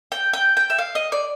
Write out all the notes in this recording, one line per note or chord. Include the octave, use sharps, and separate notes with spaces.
G5
G5
G5
E5
F5
D#5
D5